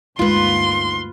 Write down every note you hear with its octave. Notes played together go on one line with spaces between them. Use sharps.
D2 G2 G#3 A#3 D#4 F4 B4 C6